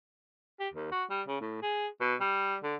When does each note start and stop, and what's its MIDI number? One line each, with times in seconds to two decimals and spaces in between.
0.60 0.69 67
0.74 0.90 39
0.92 1.04 66
1.10 1.22 55
1.27 1.39 49
1.41 1.58 45
1.62 1.88 68
2.01 2.15 47
2.20 2.56 55
2.63 2.76 50